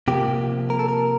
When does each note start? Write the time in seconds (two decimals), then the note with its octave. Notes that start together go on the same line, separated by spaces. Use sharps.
0.08 C3 F3 A#3 G4
0.70 A#4
0.79 A4
0.88 A#4